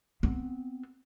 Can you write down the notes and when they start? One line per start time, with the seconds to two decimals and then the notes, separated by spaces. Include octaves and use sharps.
0.23 B3 C4